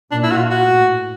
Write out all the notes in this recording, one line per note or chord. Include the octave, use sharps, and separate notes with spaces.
A#2 D4
E4
F#4
F4
F#4
A2